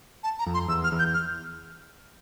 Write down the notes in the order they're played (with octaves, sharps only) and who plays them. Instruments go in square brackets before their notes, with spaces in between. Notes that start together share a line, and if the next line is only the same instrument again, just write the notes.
[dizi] A5
A#5
[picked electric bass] F2
[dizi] C6
[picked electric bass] E2 [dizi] E6
[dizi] F6
[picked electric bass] E2
[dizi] G6
F6